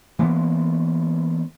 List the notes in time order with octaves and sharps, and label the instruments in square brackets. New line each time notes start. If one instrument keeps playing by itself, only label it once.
[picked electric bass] E3 G#3 A#3 B3